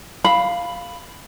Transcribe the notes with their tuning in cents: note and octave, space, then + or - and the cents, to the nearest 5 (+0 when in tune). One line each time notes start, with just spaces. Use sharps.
F5 +0 B5 +0